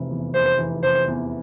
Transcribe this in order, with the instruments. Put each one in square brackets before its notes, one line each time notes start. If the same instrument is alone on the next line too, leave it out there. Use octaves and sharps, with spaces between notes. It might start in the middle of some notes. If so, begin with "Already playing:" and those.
Already playing: [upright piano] F1 C3 E3
E2
[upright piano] F1 [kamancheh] C5
[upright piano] E3
[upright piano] C3 [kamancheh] C5
[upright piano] E2